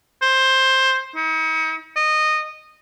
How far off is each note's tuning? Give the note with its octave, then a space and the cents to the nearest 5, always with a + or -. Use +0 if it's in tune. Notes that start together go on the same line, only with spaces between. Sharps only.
C5 +10
D#4 +45
D#5 -15